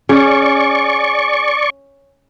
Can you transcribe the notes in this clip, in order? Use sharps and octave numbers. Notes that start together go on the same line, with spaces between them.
C#4 G#4 D5 C#6